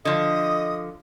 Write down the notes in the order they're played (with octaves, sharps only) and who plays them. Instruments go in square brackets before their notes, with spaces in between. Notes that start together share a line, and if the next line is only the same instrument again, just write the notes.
[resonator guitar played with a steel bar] D3 F3 [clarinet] D#5 [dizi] D#6